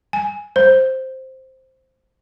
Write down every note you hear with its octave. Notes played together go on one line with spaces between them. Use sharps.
G#5
C5